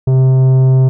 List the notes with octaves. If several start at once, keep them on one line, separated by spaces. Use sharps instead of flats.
C3